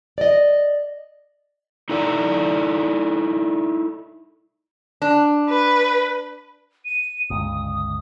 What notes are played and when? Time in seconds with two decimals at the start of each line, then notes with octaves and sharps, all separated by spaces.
0.18 D5 D#5
1.89 D#4 E4 A4 D5 G5 A#5
5.02 D4
5.50 B4
6.85 D#7
7.30 G1 C#2 D#6